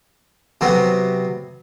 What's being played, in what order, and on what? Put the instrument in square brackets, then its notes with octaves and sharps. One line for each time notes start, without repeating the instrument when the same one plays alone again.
[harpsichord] C3 F#3 B3